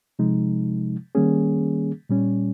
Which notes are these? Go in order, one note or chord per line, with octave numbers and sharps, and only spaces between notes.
C3 F3 G#3 D#4
D#3 G3 A#3 C#4 G#4
A#2 G3 C#4